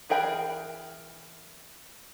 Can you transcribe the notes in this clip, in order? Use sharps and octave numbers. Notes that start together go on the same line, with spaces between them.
E3 G#4 A#4 G5 B5